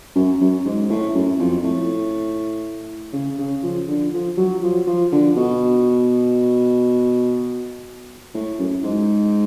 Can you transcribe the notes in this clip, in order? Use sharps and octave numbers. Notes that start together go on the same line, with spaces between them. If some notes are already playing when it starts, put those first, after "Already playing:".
F#2
F#2
G#2
A2
F#2
F2
A2
C#3
C#3
F3
D3
F3
F#3
F3
F3
D3
B2
A2
F#2
G#2